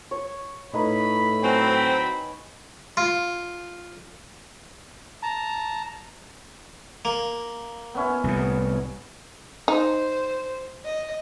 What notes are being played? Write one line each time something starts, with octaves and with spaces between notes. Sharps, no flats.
C#5
A2 D#4 B4 B5
F#3 C4 G#5 C#6
F4
A5 A#5
A#3
B3 C#4 E4
C2 A2
D#4 C5
D#5